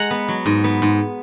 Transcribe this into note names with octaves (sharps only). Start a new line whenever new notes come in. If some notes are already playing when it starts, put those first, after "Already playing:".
Already playing: G#3 F#5 G#5 A#5
B3
F#3
G#2
B3
G#2